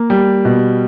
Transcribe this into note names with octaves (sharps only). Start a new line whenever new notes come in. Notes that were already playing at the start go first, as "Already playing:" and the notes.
Already playing: A#3
G3
B2